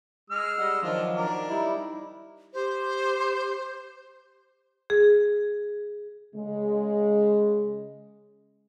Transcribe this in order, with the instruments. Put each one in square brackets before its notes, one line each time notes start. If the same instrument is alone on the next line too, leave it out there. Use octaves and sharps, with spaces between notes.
[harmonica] G#3 E6 F6
[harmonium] G3 D#5 F#5
[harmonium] D#3 F3 F#3 [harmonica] D4 F4
[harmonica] D4 A#4 D5
[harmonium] G3 D#4 E4
[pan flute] G4 [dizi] C5
[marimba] G#4
[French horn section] C#3 G#3